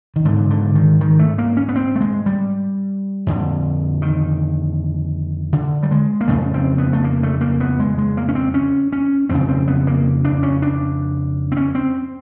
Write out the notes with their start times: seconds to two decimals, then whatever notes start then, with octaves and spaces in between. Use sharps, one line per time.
0.16 D#3
0.25 G#2 D3
0.50 D3
0.75 D#3
1.01 D#3
1.19 A3
1.38 A#3
1.57 C#4
1.69 B3
1.76 C4
1.96 A3
2.01 G#3
2.26 G3
3.27 F2 D3
4.02 D#3
5.53 D3
5.83 G3
5.91 G#3
6.21 A#3
6.28 F2 C#3 A3
6.54 C4
6.78 B3
6.93 A3
7.04 A#3
7.23 A3
7.41 A#3
7.60 B3
7.80 G#3
7.98 G#3
8.17 A#3
8.29 C#4
8.35 C4
8.54 C#4
8.92 C#4
9.29 F2 C#3 C4
9.49 C4
9.68 B3
9.87 A#3
10.24 D4
10.43 C#4
10.62 D4
11.52 C4
11.57 C#4
11.75 C4